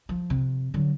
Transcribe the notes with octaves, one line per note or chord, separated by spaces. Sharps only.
F3
F2 C3
D3 F#3